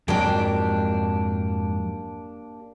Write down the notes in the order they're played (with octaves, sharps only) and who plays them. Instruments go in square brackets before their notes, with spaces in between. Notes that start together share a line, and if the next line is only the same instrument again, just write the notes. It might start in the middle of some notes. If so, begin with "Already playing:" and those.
[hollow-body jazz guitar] F2 G#2 F#3 [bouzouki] A#3 D4 G4